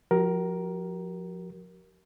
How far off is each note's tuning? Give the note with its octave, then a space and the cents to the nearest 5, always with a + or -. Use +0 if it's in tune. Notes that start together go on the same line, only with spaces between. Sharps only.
F3 +25 G4 -45 A#4 +10